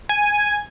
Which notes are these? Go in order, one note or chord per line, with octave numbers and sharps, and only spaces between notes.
G#5